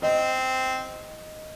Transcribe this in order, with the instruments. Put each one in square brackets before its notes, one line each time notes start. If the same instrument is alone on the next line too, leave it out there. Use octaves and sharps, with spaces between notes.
[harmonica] C4 [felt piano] D#5